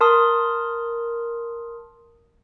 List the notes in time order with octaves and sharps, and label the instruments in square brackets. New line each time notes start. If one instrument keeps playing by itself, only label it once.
[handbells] A#4 A5 C6 D#6